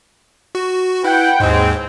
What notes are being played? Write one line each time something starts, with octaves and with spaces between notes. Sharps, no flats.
F#4
E4 B4 F#5 G5
D#2 G#2 G#3 C4